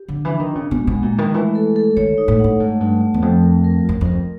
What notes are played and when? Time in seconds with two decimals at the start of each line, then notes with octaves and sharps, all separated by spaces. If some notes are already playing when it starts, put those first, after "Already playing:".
Already playing: G4
0.08 D3 D4
0.25 E3
0.30 D4
0.40 D#3
0.50 C#3 F4
0.71 B2 G#3
0.87 B2
0.92 G#3
1.03 A#2
1.13 G#3
1.18 D#3
1.34 E3 A3
1.55 A4
1.76 A4
1.97 D#3 C#5
2.18 D#4
2.28 A2
2.39 F#5
2.44 A2
2.60 G#2 A3
2.81 G2 A3
3.01 A3
3.14 E2
3.22 F2 F4
3.43 A#4
3.64 A#4
3.85 F#2 F4
4.01 F2 A#4